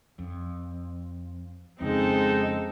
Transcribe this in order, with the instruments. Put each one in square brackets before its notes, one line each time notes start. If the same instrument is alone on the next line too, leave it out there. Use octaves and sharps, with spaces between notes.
[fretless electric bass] F2
[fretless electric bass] F2 C#3 [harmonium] G#3 [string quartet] C4 D#4 A4